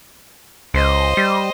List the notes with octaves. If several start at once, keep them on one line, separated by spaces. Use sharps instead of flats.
C#2 C5 D#5
G3